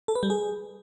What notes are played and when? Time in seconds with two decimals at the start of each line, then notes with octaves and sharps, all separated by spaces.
0.08 A4
0.15 B4
0.23 G3
0.30 G#4